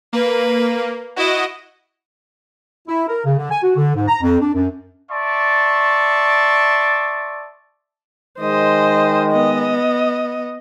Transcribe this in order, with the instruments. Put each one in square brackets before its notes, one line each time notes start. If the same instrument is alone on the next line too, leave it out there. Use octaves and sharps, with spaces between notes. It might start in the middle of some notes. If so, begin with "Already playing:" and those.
[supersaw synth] A#3 [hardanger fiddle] B4
[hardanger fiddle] E4 [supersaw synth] F#4 D#5
[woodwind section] E4
A#4
C#3
D3
G#5
F#4
D3
G#2
A#5
F2
D4
F#2
[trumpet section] D5 E5 A5 C6 C#6
[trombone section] D#3 G#3 [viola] C5 D#5
[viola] B3 D#5